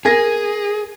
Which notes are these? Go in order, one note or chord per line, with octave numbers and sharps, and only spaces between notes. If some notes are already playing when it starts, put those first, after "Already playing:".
G#4 A#4 G#6 A#6